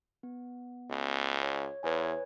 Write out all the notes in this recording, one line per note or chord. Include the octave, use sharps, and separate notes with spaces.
B3
C#2
C#5
E2 B4 C#5 G#5